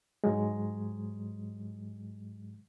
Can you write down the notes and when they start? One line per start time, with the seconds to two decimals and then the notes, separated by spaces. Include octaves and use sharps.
0.24 G#2 F#3 G#3